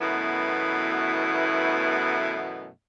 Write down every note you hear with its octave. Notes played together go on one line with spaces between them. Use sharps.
F#2 B2 E3 A3 B3 E4